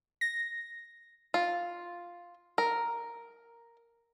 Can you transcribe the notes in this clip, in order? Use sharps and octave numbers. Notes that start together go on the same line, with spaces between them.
A#6
F4
A#4